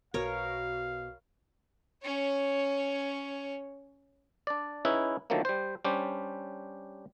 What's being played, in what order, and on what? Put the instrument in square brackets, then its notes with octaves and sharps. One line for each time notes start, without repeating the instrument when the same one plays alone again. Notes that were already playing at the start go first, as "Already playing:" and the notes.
[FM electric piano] B1 [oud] B2 [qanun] A#4 C#5 [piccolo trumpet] F5
[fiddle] C#4 C#5
[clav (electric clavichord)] D4 D5
C#4 D#4 E4 G#4 B4
D3 D#3 F3 F#3 A3 A#3
G3 C5
G3 C#4 D4 G4 C5